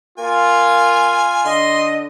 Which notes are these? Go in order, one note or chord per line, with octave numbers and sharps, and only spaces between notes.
A#3 F4 G#5
D3 D#5 C6